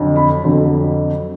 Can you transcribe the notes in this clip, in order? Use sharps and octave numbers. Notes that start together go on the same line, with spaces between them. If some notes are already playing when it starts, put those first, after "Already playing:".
Already playing: F2 D3 F#3
B5
F2 D3 F#3